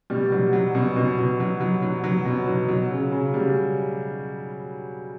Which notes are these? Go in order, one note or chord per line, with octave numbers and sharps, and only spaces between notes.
B2 G3
F#3 G3
F#3
B2
B2
B2
F#3
F#3
F#3
F#3
B2
F#3
F#3
C#3
C#3
C#3 G3